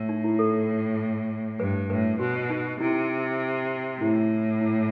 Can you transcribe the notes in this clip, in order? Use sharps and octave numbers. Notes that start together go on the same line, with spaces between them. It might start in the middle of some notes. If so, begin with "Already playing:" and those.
Already playing: A2
D#4
E4
A4
G2 B4
A2 B4
B2 F#4
D#4
C3 E4
A2 E4
E4